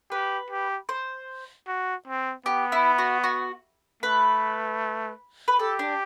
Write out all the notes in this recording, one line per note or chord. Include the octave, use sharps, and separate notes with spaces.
G4 B4
G4
C5
F#4
C4
B3 G4
E4
F#4
F#4
A3 B4
B4
G4 A4
D4